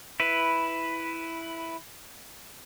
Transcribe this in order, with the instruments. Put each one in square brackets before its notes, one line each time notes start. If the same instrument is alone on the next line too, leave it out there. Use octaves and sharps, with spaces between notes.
[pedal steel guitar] E4 B4